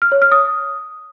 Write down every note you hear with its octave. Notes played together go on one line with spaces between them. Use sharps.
F6
C#5
F6
D#6